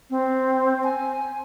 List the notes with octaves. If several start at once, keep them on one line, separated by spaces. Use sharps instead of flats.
C4
G#5